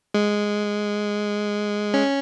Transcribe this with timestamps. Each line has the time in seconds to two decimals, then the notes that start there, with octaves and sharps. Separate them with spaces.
0.14 G#3
1.94 C#4